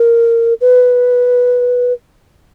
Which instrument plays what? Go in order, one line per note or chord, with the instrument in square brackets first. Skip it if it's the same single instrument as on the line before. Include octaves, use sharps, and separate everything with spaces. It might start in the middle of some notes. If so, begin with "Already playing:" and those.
Already playing: [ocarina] A#4
B4